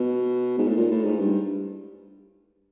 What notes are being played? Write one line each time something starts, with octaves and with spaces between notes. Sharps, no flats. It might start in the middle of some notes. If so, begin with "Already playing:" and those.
Already playing: B2
G#2
A2
A#2
A2
G#2
G2